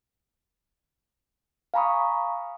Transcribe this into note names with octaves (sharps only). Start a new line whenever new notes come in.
F5 G#5 A#5 B5 C#6 D#6